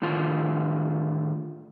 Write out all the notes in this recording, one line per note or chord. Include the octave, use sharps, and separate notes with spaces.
A2 D3 D#3 F4